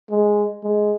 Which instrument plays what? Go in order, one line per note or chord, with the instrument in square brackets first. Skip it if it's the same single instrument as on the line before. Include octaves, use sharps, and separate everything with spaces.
[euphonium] G#3
G#3